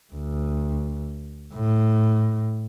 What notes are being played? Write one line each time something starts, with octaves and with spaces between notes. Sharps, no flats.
D2
A2